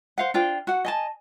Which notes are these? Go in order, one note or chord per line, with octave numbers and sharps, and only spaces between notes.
C5 F5 F#5
D4 F4 C5 G5
F#4 F#5
D#5 G#5 A5